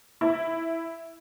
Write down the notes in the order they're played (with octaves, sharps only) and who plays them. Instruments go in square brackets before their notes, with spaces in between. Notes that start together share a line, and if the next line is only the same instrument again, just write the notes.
[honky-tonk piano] E4